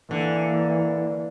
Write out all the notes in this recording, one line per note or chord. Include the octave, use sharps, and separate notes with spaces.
D3 E3 A#3